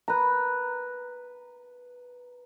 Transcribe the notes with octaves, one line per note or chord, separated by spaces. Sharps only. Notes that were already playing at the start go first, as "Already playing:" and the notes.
B4 A#5